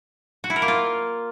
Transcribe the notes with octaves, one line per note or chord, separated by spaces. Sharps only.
F#4
E4
A#4
A#3
F4